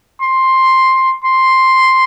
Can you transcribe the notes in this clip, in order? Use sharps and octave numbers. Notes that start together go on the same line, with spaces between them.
C6
C6